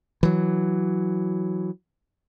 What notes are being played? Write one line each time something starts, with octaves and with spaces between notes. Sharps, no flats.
E3 F#3